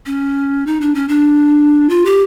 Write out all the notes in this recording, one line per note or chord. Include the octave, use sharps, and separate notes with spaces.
C#4
D#4
D4
C#4
D4
F4
G4